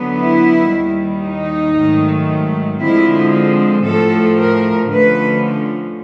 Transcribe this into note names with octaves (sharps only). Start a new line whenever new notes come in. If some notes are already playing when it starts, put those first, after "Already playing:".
Already playing: D3 F#3 B3
E4
D#2 D#3 G3
D#4
G#2 D#3 F#3 A3
D3 F3 G#3 C4 E4
A2 F3 A3 A4
A#4
D3 F3 A3 C#4 B4